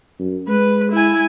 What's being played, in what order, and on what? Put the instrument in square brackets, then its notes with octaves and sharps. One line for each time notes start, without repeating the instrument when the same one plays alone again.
[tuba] F#2
[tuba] G#3 [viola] B4
[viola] E4 G#5